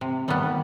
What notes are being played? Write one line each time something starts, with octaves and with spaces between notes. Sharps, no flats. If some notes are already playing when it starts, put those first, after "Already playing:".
C3
D#3 G3 B3